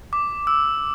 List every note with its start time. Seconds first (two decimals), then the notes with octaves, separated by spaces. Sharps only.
0.13 D6
0.47 E6